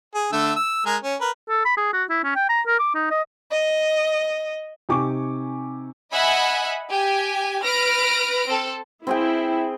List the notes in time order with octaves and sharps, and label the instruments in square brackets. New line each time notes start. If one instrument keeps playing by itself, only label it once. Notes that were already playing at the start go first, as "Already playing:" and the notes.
[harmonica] G#4
D3 A3 E6
E6
G#3 A#4 G#5
C#4
A#4 B4
[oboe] A4
B5
G#4
F#4
E4
C#4
G5
A#5
A#4
D6
D#4
D#5
[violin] D#5
[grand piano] C3 D#4 G4 G#5 C#6 D6
[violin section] D#5 E5 F#5 G#5 B5
G4 G#5
B4 F6 A#6 D7
C4 A4
[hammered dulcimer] C4 G#4 G5 [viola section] E4